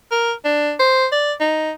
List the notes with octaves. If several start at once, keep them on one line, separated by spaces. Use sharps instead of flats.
A#4
D4
C5
D5
D#4